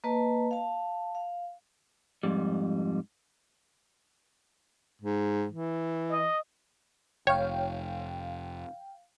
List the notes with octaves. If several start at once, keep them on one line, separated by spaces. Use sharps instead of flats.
A#3 B4 D#5 A5
F5 A5
F5
F2 G#2 G3
G#2
E3
D#5
F1 C#5 F5 G5